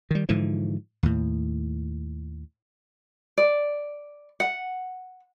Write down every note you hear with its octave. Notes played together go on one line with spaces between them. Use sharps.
D#3 G3
G#2 D3 E3 F3
D#2 A2
D5
F#5